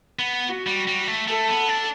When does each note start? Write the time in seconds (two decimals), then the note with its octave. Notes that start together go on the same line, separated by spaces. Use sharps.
0.19 B3
0.47 F#4
0.67 G3
0.87 G3
1.08 A3
1.28 A3 A4
1.49 B3
1.69 D4